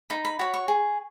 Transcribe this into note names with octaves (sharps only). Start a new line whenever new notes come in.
D#4 B5
B5
F#4 C#5 B5
C#6
G#4